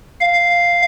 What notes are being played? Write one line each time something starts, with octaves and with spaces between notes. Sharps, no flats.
F5